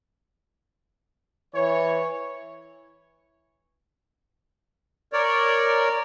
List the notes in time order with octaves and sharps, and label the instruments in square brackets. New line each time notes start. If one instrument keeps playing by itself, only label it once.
[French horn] E3 [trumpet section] C#5
[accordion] A#4 C#5 D5